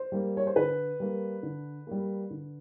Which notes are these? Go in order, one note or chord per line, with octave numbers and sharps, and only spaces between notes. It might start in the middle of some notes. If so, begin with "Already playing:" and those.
Already playing: C5
G3 A#3
C#5
C5
D3 B4
G3 A#3
D3
G3 A#3
D3